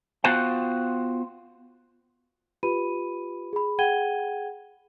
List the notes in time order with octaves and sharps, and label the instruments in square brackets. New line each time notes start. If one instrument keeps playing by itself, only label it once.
[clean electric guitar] B3 F4 F#4 C5 F5 G5
[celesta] F4 G4 B4 B5 D#7
G#4 B5
G#4 F#5 G5 G#6 D#7 G7